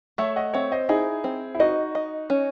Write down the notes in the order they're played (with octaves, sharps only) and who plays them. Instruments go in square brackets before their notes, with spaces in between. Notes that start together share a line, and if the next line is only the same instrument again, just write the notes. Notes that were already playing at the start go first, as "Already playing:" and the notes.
[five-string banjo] A3 [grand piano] C#5 E5
[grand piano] D#5 F#5
[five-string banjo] C4 [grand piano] C#5 E5
[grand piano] C5 D#5
[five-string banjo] D#4 [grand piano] E4 G#4
[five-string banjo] C4
[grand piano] E4
[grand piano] D#4 F#4 [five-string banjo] D#5
[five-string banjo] D#5
C#4